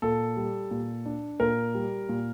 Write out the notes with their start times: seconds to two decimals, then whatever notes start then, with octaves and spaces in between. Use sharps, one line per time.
0.02 A#2 A4
0.37 G3
0.71 A#2
1.06 D4
1.40 A#2 A#4
1.75 G3
2.09 A#2